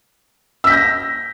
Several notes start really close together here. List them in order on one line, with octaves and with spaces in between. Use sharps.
E6 B6 G6 A#6